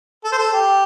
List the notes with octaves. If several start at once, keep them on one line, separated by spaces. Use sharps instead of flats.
A4
C5
A4
G4